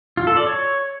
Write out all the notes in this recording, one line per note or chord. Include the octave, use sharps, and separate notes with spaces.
F4
A4
D5
C#5